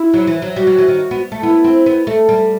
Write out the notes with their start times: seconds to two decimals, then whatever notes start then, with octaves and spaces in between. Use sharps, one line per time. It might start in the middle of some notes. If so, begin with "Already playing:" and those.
Already playing: E4
0.14 F#3
0.27 E3
0.42 F#3
0.56 G3 F#4
0.67 F#3
0.78 E3
0.88 D#3
1.11 B3
1.32 A3
1.42 B3 E4
1.64 C4
1.86 B3
2.07 A3
2.29 G3